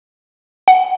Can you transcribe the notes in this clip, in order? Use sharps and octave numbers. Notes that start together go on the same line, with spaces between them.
F#5